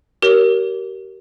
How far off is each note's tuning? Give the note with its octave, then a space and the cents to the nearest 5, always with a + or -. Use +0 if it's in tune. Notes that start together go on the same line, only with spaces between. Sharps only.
G4 -35 A#4 +0 C#5 +10